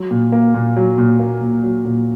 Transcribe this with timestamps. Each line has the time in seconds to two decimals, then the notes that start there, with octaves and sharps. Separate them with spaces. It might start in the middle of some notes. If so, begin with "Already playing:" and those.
Already playing: F#3
0.11 A#2
0.32 A#3
0.54 A#2
0.76 F#3
0.98 A#2
1.19 A#3
1.41 A#2
1.63 F#3
1.85 A#2